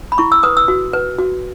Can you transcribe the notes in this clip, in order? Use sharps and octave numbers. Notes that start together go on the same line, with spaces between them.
B5
E4 C#6
E6
B4 D#6
E6
F#4
B4
F#4